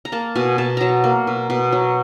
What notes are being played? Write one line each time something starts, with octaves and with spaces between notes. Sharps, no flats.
A#5
A#3 A5
B2 G#5
B2 A5
F#3 A5 A#5
A#3
B2
B2
F#3